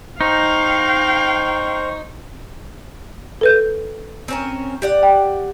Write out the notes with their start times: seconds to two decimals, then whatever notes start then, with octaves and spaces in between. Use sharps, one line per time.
0.21 D#4 C5 F5 G5 C#6
3.41 A4 B4 G6
4.28 C4 C#4 A#4
4.82 G4 D5 F#5
5.03 G5